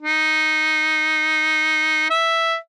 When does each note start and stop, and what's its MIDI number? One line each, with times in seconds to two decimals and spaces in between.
0.02 2.08 63
2.10 2.56 76